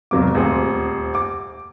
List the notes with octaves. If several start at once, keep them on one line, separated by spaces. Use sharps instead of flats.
E1 C3 F#3 A#3 D6
D#1 D2 C4 G#4 C5
D6